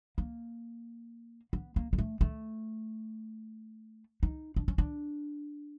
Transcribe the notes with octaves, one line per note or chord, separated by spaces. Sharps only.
A#3
B3
A#3
G#3
A3
A3
D#4
D4
C#4
D4